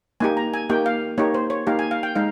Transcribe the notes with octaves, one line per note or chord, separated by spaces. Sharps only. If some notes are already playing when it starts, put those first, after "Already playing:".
A#3 D#4 G4 G#5
A#5
G#5
A#3 D#4 G4 G5
F5
A#3 D#4 G4 C#5
C5
C#5
A#3 D#4 G4 F5
G#5
F5
G5
G#3 D#4 F5